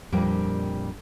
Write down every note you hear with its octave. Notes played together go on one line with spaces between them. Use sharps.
F2 A#2 G3 A#3 D4 G5